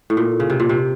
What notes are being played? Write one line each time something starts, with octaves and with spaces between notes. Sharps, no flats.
A2
A#2
C#3
C3
A#2
C3